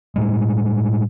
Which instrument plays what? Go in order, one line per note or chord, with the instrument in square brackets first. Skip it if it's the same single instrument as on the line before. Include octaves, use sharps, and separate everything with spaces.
[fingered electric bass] A2 G3 G#3